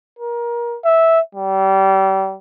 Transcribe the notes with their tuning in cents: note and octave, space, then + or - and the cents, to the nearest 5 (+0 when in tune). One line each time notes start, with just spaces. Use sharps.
A#4 +25
E5 -10
G3 -30